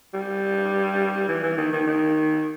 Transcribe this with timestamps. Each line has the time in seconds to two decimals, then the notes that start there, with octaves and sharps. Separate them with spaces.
0.14 G3
1.28 E3
1.43 E3
1.57 D#3
1.72 D#3
1.87 D#3